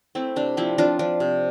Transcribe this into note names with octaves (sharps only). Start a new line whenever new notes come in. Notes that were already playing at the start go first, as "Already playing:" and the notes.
A3 C4 E4
C3 D4
F3 C4 E4
F3 D4 F4
F3 D4
C3